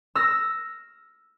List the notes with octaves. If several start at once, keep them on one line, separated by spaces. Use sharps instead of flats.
E6 F6 A#6